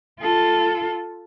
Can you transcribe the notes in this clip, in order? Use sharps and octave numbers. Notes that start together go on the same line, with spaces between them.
F4 A4